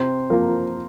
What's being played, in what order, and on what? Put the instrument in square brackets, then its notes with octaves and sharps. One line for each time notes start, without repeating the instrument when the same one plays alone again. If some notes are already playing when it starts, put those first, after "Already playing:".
Already playing: [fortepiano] C3 [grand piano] C5
[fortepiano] F3 A#3 [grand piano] A#4